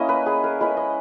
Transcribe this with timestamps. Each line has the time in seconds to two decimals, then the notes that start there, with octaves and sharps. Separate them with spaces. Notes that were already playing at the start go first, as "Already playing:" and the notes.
Already playing: A#3 C#4 E4 D#5
0.09 B4
0.26 G#4
0.44 A#4
0.60 G#3 C#4 E4 B4
0.77 D#5